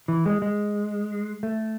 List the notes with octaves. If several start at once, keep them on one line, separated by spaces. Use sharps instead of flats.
E3
G#3
G#3
A3